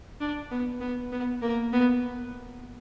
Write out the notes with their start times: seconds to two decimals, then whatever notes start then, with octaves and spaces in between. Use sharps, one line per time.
0.20 D4
0.51 B3
0.81 B3
1.12 B3
1.42 A#3
1.73 B3